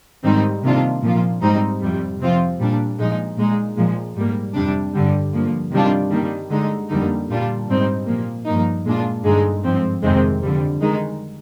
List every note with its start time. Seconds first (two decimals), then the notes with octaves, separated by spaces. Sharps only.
0.24 G#2 D#3 G3 C4 D#4
0.63 C3 D#3 A#3 D4 F4
1.02 A#2 F3 A#3 F4
1.42 G#2 G3 C4 D#4
1.81 F2 C3 G3
2.20 C3 F3 C4 F4
2.59 A#2 G3 D4
2.99 A#2 F3 G#3 D#4
3.37 A#2 G#3 D#4
3.77 A#2 F3 G#3
4.16 G#2 G3 A#3
4.55 F2 C3 G3 D4
4.95 G2 D3 G3
5.34 G2 F3 A#3
5.73 C3 D#3 G3 D4 F4
6.11 D#3 G3 A#3
6.50 D3 G#3 D#4
6.89 F2 D3 G3 A#3 D#4
7.29 A#2 G3 D4 F4
7.68 G#2 G3 C4 D#4
8.07 A#2 F3 A#3
8.46 G2 F3 A#3 D#4
8.85 A#2 G#3 D4 F4
9.24 G2 D3 G#3 D#4
9.64 G#2 F3 C4
10.03 F2 C3 D#3 G#3 C4
10.42 F2 D3 G3
10.81 D#3 G#3 D#4